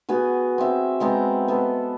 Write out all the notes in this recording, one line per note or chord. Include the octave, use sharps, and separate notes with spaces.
B3 F#4 G#4
C4 E5
G#3 B3 C4 A#5
B3 A4